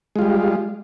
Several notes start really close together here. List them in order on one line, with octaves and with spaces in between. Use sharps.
G#3 F4 G3